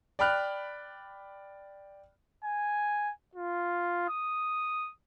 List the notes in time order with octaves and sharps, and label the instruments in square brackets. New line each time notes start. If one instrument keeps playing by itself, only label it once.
[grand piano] D5 G5 B5 F6 F#6
[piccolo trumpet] G#5
F4
D#6